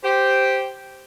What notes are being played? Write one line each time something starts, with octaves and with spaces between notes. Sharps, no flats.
G4 C5